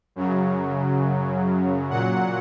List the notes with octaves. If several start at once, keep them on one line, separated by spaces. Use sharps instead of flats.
F#2 C#3 F#3
A#2 F#3 F#5